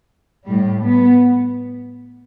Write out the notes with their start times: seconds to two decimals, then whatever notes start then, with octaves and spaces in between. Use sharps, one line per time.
0.47 A2 G3
0.82 B3